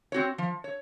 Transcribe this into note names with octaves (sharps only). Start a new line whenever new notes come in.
C4 F#4 C#5
F3
C#5